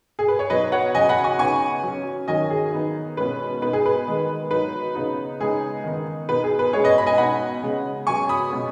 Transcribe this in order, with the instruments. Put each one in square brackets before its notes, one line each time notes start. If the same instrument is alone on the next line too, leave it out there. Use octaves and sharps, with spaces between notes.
[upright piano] G#4
B4
C#5
B2 F#3 D#4 B4 D#5
C#5 F#5
C#3 F#3 C#4 D#5 G#5
F#5 B5
G#5 C#6
C#3 B3 D#4 G#5 C#6
F#3 C#4
D#3 F#3 C#4 D#5 G#5
G#4
D#3 B3 D#4
B2 G#3 C#4 B4
B2 B3 D#4 B4
G#4
B4
D#3 G#3 B3
F#3 B3 D#4 B4
C#3 B3 D#4
C#3 G#3 B3 D#4 G#4
D#3 B3 D#4
B2 B3 D#4 B4
G#4
B4
B2 G#3 C#4 G#4 C#5
B4 D#5
B5
D#5 G#5
B2 B3 D#4 F#5 B5
C#3 G#3 B3
C#3 F#3 B3 G#5 C#6
B5 D#6
B2 G#3 C#4